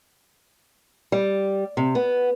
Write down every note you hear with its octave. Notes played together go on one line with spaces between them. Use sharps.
G3
C3
B3